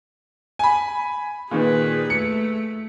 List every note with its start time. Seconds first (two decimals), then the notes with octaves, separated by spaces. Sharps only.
0.59 G#5 B5
1.51 A#2 D#3 G#4 B4
2.10 A3 C#7